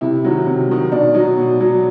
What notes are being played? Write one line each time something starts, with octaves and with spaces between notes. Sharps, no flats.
C3 E4
D#3 F#3
C3
D#3 F#3
B2 D4
F#3 D#4
B2
F#3